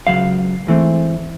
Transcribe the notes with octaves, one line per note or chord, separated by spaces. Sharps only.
C#2 C#3 F#3 F5
G#2 E3 A3 C4